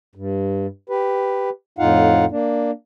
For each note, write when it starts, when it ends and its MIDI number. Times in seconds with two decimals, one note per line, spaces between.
0.15 0.67 43
0.90 1.50 67
0.90 1.50 71
1.79 2.25 41
1.79 2.25 45
1.79 2.25 63
1.79 2.25 65
1.79 2.25 77
1.79 2.25 78
2.31 2.71 58
2.31 2.71 62